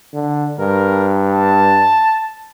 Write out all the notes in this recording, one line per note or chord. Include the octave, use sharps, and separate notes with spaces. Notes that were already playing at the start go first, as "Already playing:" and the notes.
D3
G2 A#4
A5